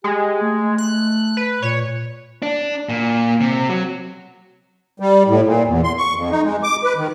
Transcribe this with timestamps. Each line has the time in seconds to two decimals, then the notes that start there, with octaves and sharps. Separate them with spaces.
0.04 G#3 G4
0.41 A3
0.78 F#6
1.37 B4
1.62 A#2 C#5
2.42 D4
2.89 A#2
3.41 C3
3.69 F#3
5.00 G3
5.27 A2
5.45 A#2
5.67 E2
5.84 C6
5.98 C#6
6.15 F2
6.31 D#4
6.44 G#3
6.63 D6
6.84 B4
6.97 D#3